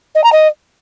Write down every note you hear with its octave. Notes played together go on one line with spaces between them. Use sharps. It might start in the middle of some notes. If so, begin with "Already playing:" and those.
D#5
A#5
D#5